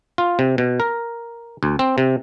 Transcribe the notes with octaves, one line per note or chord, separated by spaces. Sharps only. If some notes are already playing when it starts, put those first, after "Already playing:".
F4
C3
B2
A#4
D2
C4
C3